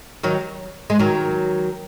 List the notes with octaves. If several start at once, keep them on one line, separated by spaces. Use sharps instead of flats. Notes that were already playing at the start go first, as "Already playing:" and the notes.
D#3 F#3
G#3
D#3 F#3